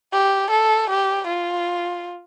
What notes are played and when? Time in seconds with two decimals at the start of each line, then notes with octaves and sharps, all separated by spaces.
0.13 G4
0.51 A4
0.90 G4
1.28 F4